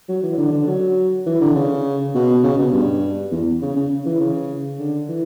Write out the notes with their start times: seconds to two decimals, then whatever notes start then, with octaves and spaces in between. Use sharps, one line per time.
0.08 F#3
0.23 E3
0.38 D3
0.52 D3
0.67 F#3
1.26 E3
1.41 D3
1.55 C#3
2.14 B2
2.43 C#3
2.58 B2
2.73 G2
3.32 E2
3.62 C#3
3.76 C#3
4.06 E3
4.20 C#3
4.79 D3
5.09 E3